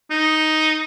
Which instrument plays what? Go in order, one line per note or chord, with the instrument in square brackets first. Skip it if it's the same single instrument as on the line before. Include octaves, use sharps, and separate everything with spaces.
[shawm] D#4